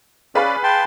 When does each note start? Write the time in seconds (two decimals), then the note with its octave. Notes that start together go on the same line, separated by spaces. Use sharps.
0.35 C#4 G#4 B4 D5 F5
0.63 G5 A5 C6